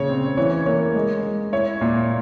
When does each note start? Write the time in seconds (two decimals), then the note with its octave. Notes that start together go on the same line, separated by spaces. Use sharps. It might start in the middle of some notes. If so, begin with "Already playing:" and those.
Already playing: A#2 C#3 C#5
0.10 C4
0.37 E3 C#5
0.66 A#3 C#5
0.95 G#3
1.23 G#3
1.53 E4 C#5
1.81 A#2